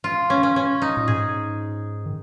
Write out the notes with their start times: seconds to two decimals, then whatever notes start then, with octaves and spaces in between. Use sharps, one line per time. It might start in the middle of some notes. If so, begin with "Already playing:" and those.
0.04 F4
0.30 C#4
0.43 C#4
0.56 C#4
0.82 D#4
0.97 A#2
1.08 G#2 G#4
2.06 D#3